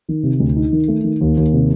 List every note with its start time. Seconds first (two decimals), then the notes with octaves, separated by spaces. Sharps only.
0.09 D#3
0.23 C3
0.40 D2
0.56 D#4
0.72 D#3
0.88 A3
1.04 D#3
1.21 D#2
1.37 D#2
1.53 C3